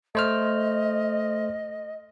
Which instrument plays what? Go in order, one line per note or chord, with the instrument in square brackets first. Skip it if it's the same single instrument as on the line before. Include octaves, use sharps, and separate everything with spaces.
[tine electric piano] A3 C5 F6 [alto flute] D#5